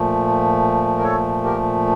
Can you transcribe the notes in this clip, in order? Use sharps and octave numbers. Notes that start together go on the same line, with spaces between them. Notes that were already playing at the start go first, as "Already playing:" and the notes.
Already playing: A#2 F3 A3
A#4
A4 C#5
G4 A#4